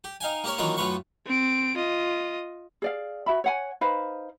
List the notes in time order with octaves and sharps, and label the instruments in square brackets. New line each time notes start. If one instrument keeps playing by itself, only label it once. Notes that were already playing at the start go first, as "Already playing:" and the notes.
[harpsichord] G4
D#4 F5 G5 G#5
A#3 G4 A#4 C#5
D#3 E3 F#3 A#3 F4 A#4
F#2 A2 F4 B4 C#6
[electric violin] C4 D7
F4 D#5
[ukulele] G#4 D5 F5
F#4 E5 B5
C#5 F#5 G#5
D#4 B4 C5 F5